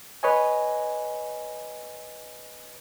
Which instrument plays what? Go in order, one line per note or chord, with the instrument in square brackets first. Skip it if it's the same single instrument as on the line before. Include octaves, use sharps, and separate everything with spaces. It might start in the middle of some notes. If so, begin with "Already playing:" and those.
[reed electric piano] B4 C#5 D#5 G#5